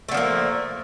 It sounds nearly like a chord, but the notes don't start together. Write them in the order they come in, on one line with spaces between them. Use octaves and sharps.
A3 D3 F3 A#3